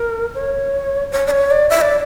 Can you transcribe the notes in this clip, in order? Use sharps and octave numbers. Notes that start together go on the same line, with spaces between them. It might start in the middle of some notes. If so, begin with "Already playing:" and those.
Already playing: A#4
C#5
C#5
D5
C#5
D5
E5
D5